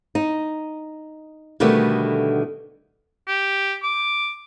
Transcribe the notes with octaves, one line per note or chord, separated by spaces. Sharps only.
D#4
B2 D3 D#3 G3 A3 B3
G4
D6